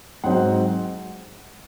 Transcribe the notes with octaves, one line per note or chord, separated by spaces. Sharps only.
G#2 F#3 C4 D#4 F#5